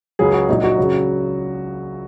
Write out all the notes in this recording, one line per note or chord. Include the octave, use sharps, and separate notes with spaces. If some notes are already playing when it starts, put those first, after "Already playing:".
C#2 C#3 F#3 G#4
F#4
A#1 A#2 F#3 D#4
F#4
C#2 C#3 F#3